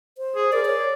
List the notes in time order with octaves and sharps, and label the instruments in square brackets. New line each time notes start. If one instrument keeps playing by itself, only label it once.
[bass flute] C5
[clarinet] G#4
[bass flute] A#4 [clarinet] D5
[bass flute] C#5